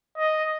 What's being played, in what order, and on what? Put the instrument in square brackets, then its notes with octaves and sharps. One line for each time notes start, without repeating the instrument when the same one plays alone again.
[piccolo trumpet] D#5